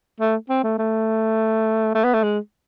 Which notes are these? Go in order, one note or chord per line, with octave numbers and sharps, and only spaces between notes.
A3
C4
A3
A3
A3
B3
A3
G#3